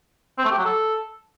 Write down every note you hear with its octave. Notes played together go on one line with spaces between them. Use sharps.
C4
A3
G4
F#3
A4